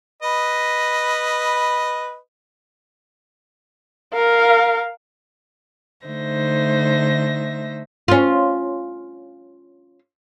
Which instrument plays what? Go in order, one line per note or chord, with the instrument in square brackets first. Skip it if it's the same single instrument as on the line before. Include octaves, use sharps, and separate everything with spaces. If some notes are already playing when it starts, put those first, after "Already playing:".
[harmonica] B4 D#5 B5
[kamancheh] A#4 F5
[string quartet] D3 A3 D#4 C5 E5 A#6
[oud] C#4 F4